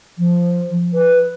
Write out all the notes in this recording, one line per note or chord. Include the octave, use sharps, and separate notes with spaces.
F3
B4